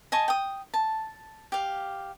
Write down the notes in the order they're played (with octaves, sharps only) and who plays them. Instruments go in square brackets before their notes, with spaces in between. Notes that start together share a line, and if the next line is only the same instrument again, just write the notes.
[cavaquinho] D#5 G#5 A5 C#6
G5 D#6
A5
G4 F5